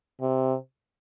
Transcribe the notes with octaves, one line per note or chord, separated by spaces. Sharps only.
C3